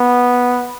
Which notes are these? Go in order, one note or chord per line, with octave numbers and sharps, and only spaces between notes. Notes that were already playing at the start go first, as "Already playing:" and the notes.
Already playing: B3